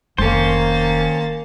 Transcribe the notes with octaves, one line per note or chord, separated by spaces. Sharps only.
F1 D#3 A#3 C#4 C5 A5